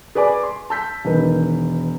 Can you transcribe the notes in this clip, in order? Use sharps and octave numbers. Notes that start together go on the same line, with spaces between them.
G#4 B4 D5 G#5 D6
C6
A5 E6 G6 B6
E1 D#3 B4